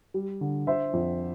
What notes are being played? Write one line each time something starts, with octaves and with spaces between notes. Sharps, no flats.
G3
D3
D3 C5 E5
F2